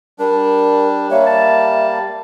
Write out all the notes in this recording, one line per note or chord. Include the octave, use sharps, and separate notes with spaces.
G3 D4 A#4
G3 A#3 C#5 E5
A5